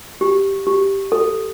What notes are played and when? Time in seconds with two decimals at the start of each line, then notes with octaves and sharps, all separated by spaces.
0.21 G4
0.67 G4
1.12 A4